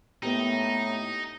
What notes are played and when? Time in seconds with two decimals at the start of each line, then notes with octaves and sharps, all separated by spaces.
0.23 A2 A#3 B3 D#4 G4